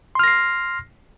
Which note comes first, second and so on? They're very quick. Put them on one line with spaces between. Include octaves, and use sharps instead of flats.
C6 F6 A#6 C7